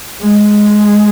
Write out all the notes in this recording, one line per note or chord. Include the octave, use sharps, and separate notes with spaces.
G#3